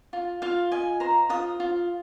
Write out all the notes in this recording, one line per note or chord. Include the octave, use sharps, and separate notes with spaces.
F4
F4 F5
D#5 G#5
C5 A#5
F4 D#6
F4